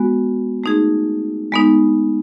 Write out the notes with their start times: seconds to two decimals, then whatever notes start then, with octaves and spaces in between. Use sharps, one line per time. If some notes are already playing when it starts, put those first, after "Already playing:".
Already playing: G#3 B3 F#4
0.64 A3 D#4 G#4
1.52 G#3 B3 D#4